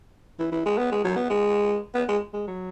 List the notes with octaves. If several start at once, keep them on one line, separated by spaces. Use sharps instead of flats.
E3
E3
G#3
B3
G#3
F#3
B3
G#3
B3
G#3
G#3
F#3